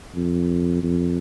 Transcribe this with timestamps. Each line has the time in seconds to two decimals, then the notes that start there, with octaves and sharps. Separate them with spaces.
0.15 F2
0.83 F2